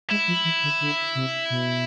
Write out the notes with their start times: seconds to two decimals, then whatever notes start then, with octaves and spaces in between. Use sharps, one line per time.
0.10 G#3 E4
0.28 F3
0.44 E3
0.63 D3
0.80 D3
1.15 C3
1.50 B2